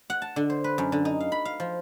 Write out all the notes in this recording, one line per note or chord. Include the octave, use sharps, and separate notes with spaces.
F#5
A5
D3
C5
B4
F#2
D3
D#4
F5
B5
F5
F3